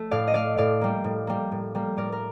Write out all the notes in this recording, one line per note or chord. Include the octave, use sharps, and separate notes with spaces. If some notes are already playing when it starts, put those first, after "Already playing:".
Already playing: A3
A2 D5 F5
D#5
A3 D5 F5
A2 D5 F5
G3 A#3
A2
G3 A#3
A2
G3 A#3
A2 A#4 D5
A#4